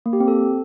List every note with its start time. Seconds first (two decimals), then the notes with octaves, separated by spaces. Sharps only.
0.06 A#3
0.13 G4
0.20 C4
0.28 A4